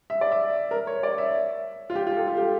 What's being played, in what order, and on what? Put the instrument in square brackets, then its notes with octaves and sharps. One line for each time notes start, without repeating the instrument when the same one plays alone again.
[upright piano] E5
D5
E5
A#4
C#5
D5
E5
F4
G4
F4
G4
A4
F4
G4